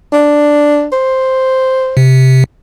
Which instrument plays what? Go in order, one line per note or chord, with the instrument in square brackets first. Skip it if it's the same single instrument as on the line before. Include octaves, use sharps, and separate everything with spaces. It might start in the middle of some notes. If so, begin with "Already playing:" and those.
[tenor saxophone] D4
C5
[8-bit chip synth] C3